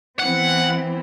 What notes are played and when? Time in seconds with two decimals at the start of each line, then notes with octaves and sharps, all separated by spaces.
0.19 E3 B3 C4 F#5